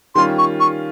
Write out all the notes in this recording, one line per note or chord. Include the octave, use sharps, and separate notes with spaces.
D#3 G3 C#4 F4 C6
C#6
C#6